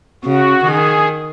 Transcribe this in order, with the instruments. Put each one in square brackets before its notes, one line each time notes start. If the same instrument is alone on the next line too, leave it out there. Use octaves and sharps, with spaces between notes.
[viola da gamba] C#3 [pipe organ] F#4
[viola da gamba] D#3 [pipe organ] G#4